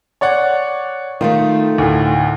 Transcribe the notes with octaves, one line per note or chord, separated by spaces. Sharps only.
C#5 D5 F#5
D#3 A3 D#4 F4
D2 A2